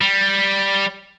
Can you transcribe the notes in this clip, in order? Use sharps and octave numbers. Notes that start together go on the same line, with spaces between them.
G3